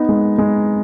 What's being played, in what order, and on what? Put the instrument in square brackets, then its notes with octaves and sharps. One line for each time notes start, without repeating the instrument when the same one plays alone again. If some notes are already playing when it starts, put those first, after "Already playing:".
Already playing: [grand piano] B3 D#4
G#3
G#3